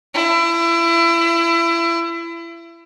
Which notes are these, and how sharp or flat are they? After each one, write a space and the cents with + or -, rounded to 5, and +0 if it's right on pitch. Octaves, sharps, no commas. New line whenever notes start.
E4 +30